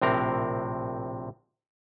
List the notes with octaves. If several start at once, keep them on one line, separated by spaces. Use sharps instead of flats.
A#1 A2 C3 C4 A#4